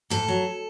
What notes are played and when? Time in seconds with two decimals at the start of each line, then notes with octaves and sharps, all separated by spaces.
0.10 G#2 A4
0.28 F#3